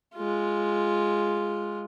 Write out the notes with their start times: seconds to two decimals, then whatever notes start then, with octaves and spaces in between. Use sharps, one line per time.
0.15 G#3 F4